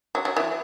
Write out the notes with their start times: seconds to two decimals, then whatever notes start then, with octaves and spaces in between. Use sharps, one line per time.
0.15 F#3
0.25 F#3
0.37 E3